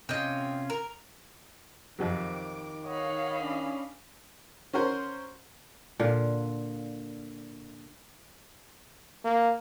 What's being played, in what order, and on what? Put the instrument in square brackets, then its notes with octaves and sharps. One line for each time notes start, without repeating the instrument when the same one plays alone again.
[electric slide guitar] C3 C#4 F4 [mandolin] D#5 G5
[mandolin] A#4
[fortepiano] F2 C3 F#3 [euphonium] D#3 [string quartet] D6
[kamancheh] C#5 F#5 [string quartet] D#5 F5 B5
[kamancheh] C#4 D4
[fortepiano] C#4 F#4 A#4 C5
[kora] A#2 D3 F4
[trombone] A#3